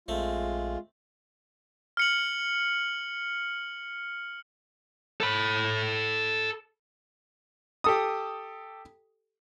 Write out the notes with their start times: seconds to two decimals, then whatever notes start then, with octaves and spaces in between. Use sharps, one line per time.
0.08 A#1 G#3 A3 C4 F4
1.97 F6 C#7 F#7
5.21 A4 B5
7.84 G4 A4 D#6